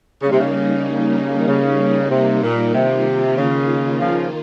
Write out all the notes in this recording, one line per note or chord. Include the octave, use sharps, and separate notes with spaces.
C#3 G3 A#3 D#4
C3
C#3
D#3
C#3
C3
A#2
C3 D#3 A#3 F4
C#3
C#3 F3